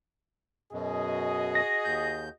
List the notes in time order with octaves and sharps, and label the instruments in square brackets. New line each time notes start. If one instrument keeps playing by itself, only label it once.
[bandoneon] F#2 B2 [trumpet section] F#4 G#4 D#5
[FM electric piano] A#6
[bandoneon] D#2 G6